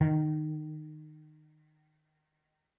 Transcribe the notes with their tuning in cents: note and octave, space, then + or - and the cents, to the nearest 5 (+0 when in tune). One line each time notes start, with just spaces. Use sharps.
D#3 -20